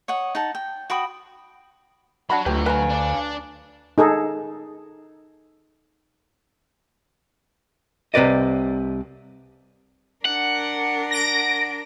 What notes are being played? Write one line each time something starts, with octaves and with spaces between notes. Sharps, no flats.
C#5 D#5 F#5
D#4 F#5 A5
G5
F#4 G5 B5 D#6
F#3 D4 F#4 B5
D2 F4 G4 B4
B4 F5 G#5 A#5
D4 D5
D#4 G#4 A4
C2 C3 B4 D5 D#5
D4 A#4 F#5
A#6 D7